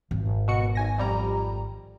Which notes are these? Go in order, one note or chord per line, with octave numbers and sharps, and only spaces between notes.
G#1
B2 F#4 C#7
B1 G#5 A#6
F2 G3 A#5